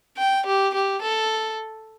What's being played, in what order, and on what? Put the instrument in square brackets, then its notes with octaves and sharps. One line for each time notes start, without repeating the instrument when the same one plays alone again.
[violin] G5
G4
G4
A4